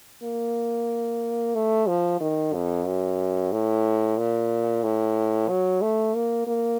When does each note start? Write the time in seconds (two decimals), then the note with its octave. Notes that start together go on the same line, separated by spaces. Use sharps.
0.23 A#3
1.55 A3
1.88 F3
2.20 D#3
2.54 F2
2.86 F#2
3.52 A2
4.18 A#2
4.84 A2
5.49 F#3
5.81 A3
6.15 A#3
6.47 A#3